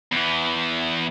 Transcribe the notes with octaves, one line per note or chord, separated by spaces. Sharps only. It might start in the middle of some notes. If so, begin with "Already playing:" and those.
E2 E3